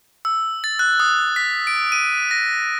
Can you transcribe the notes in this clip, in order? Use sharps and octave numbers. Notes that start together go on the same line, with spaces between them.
E6
A6
F#6
D#6
B6
D7
D#7
A#6